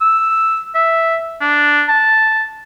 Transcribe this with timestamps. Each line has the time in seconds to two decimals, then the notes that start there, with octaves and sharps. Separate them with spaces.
0.01 E6
0.75 E5
1.41 D4
1.89 A5